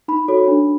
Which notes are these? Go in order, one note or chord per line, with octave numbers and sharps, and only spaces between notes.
D#4 B5
F#4 A4 C#5
D4